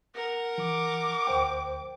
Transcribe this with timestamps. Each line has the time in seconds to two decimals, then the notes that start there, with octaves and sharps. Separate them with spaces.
0.14 A#4 F#5
0.58 E3 D6
1.27 D2 C5 G5